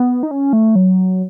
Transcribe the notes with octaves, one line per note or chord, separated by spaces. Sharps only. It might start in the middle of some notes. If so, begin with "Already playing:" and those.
Already playing: B3
D#4
C#4
A3
F#3